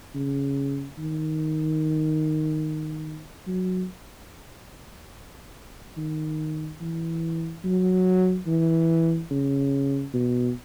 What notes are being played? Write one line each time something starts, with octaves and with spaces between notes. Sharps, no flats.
C#3
D#3
F#3
D#3
E3
F#3
E3
C#3
B2